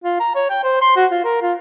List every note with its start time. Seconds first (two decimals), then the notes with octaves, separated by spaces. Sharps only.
0.05 F4
0.20 A#5
0.35 C#5
0.50 G5
0.63 C5
0.82 C6
0.96 F#4
1.12 F4
1.24 A#4
1.42 F4